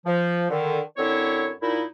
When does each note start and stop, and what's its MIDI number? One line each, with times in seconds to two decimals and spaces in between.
0.05 0.45 53
0.50 0.80 50
0.50 0.80 51
0.97 1.52 42
0.97 1.52 50
0.97 1.52 60
0.97 1.52 64
0.97 1.52 73
1.61 1.84 46
1.61 1.84 63
1.61 1.84 64